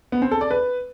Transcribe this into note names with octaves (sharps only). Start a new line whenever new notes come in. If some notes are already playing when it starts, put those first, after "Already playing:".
B3
C4
A4
D5
B4